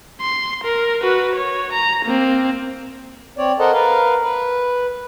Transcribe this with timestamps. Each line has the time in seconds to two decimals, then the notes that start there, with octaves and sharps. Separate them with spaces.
0.21 C6
0.64 A#4
1.02 F#4 B4
1.35 C#5
1.73 A#5
2.05 A#3 C4
3.38 C4 C#5 D5
3.59 A4 A#4 C5 D#5 F#5 A5
3.73 A#4 B4 F5
4.22 B4